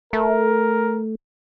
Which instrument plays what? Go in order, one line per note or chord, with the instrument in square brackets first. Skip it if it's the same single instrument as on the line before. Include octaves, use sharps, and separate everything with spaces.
[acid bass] A3 [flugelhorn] A#4